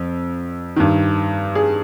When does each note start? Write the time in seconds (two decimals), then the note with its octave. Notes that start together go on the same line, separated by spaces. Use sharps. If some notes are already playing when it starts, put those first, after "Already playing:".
Already playing: F2
0.76 G2 D#3
1.55 G#4